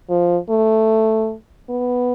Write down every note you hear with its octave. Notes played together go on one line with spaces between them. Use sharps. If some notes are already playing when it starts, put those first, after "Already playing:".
F3
A3
B3